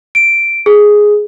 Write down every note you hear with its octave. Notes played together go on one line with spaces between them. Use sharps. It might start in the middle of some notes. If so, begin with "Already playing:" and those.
D7
G#4